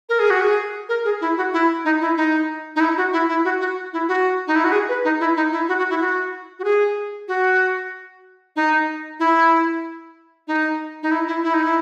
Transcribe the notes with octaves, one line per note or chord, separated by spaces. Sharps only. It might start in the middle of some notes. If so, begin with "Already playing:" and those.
A#4
G#4
F#4
G#4
A#4
G#4
E4
F#4
E4
D#4
E4
D#4
D#4
E4
F#4
E4
E4
F#4
F#4
E4
F#4
D#4
E4
F#4
G#4
B4
D#4
E4
D#4
E4
F#4
F#4
E4
F#4
F#4
G#4
F#4
D#4
E4
D#4
D#4
E4
E4
E4
D#4
E4